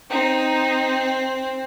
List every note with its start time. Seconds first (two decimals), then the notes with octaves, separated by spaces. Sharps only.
0.10 C4 D#4